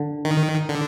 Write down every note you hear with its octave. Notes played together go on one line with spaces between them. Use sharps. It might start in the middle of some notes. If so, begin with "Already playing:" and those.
Already playing: D3
D#3
D3